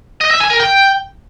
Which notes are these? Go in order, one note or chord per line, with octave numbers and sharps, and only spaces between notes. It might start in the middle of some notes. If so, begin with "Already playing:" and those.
D#5
E5
G#5
A#4
G5